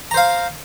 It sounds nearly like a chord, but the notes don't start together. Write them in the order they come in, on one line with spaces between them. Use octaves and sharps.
A#5 C5 F5